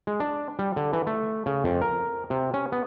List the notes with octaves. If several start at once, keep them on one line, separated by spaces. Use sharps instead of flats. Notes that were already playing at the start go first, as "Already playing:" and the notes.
G#3
D4
G3
D3
E3
A3
C#3
F2
A#4
C3
C#4
B3